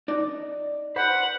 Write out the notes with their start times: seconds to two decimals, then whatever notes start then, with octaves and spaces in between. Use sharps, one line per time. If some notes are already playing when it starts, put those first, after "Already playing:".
0.08 D#4 D5
0.96 B4 C5 F#5 B5